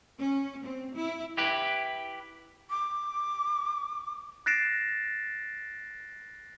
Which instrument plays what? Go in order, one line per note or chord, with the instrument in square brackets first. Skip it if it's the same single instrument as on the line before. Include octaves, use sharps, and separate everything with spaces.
[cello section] C#4
C4
E4
[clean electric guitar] E4 G4 B4
[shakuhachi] D6
[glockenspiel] F#6 A6 A#6 C7 D7 E7